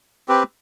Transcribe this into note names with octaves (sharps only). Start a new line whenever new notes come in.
C4 G4 B4